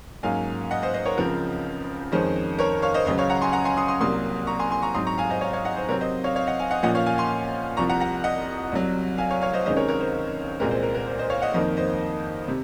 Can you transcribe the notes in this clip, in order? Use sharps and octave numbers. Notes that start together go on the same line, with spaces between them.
G#2 F#3 A#3 C#4 F5 G#5
D#5 F#5
C5 D#5
C5 D#5
A#4 C#5
C#2 C#3 F3 C4 A#4
F2 D#3 G#3 C#4 C5
A#4 C#5
C#5 F5
C5 D#5
C#2 C#3 F#3 C5 D#5
C#5 F5
F#5 A#5
G#5 C6
F#5 A#5
G#5 C6
C6 D#6
C6 D#6
C2 C3 F#3 A#3 C6 D#6
A#5 C#6
G#5 C6
G#5 C6
A#5 C#6
G#2 F#3 C4 C6 D#6
A#5 C#6
F5 G#5
C5 D#5
C#5 F5
C#5 F5
D#5 F#5
C5
C3 F#3 C4 A#4 C#5
C5 D#5
C#5 F5
C#5 F5
D#5 F#5
F5 G#5
D#5 F#5
A#2 F3 A#3 C#4 D#5 F#5
C#5 F5
F5 G#5
G#5 C6
C2 C3 F3 A#5 C#6
F#5 A#5
F#5 A#5
D#5 F#5
C2 C3 F#3
F5 G#5
C#5 F5
C#5 F5
C5 D#5
C#2 C3 D#3 G#3 C#4 C5 D#5
A#4 C#5
A#4 C#5
C5
C2 A#2 G#3 C4 A#4
C5
A#4
A#4
C5
C5 D#5
C#5 F5
D#5 F#5
F2 D#3 A#3 C5 D#5
C5 D#5
C3